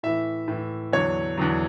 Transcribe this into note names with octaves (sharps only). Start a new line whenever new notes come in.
A2 E3 E5
A2 E3
E2 D3 F#3 C#5
E2 D3 F#3